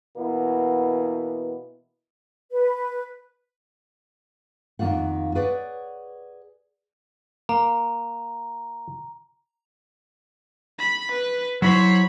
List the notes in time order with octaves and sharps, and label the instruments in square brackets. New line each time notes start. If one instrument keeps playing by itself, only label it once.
[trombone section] B2 E3 A#3 B3 E4
[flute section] B4
[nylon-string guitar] F2 D#3 A#3 D4 F4 F#5
G#4 B4 C#5 D5 F#5
[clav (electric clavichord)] A#3 [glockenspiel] A#5
[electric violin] B5
B4
[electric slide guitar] F#3 E4 C5 [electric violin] C#5 B5